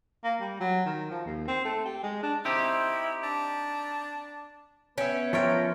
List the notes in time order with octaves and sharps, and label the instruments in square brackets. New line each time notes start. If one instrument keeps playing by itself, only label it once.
[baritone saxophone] A#3
G3
F#3
D#3
F3
D#2
C4
A3
G4
G#3
D4
[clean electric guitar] C4 D#4 G4 [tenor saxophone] E4
[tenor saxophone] D4
[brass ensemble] B3 B4 [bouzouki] C#4 [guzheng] E5 G5
[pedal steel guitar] F3 A#4 [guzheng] C#5 E5 G5